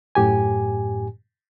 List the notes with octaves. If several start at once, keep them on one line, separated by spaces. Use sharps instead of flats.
F#2 A2 G4 G#5